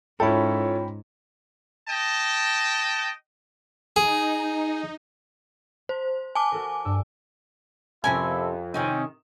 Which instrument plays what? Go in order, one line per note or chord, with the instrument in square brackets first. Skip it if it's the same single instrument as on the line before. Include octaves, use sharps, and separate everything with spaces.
[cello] G#2 [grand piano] C#4 E4 A4 [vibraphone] F4 C#5 [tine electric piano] G5 B5
[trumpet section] D#5 G5 A5
[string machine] D#4 [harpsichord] G#4
[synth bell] C5 [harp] C6
[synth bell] G#5 A5 D6
[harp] F#4 A4 A#4
G2 D6 E6
[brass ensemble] F2 [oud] C3 C#4 A#4 [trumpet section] E4 A4 [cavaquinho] G#5
[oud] C3 D#3 D#4 [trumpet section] C4 C#4